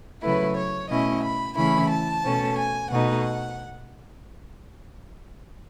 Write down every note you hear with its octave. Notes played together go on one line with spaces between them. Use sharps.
C#3 F#3 A3 E4 B4
C#5
B2 A3 C#4 E4 D#5
B5
C#3 E3 A3 C#4 E4 B5
A5
B2 A3 C#4
G#5
B2 A3 D#4 F#5